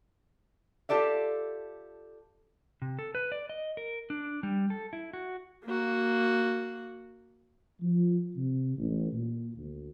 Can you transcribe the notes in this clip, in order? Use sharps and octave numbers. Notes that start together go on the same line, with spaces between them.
F4 G4 A4 D5 E5
C3
A4
B4
D5
D#5
A#4
D4
G3
A4
E4
F#4
A#3 F#4
F3
C3
A1
A#2
D2